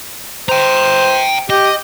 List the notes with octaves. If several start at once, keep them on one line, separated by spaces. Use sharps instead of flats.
C5 G5 A#5
G4 D#5